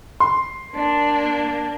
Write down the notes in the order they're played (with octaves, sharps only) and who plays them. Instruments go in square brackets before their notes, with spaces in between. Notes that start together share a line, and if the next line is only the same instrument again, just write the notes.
[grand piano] C6
[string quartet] A#3 D4